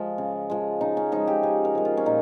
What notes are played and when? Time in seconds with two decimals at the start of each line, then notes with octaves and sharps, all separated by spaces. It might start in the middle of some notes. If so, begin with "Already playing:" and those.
Already playing: F3 G#3 F4
0.18 C#3
0.50 F3 G#3
0.81 C#3 D#4
0.97 C#4
1.12 F3 G#3 D#4
1.27 G4
1.43 C#3 G#4
1.65 A#4
1.75 F3 G#3
1.85 F4
1.97 C#4
2.06 A#2 D#4